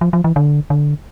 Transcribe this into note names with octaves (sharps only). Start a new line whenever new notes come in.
F3
F3
E3
D3
D3